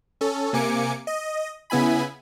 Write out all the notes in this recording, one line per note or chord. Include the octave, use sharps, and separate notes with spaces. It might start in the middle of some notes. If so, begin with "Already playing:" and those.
C#4 A4
C3 A#3 G#5 D6 C#7
D#5
C#3 B3 E4 G#5 B5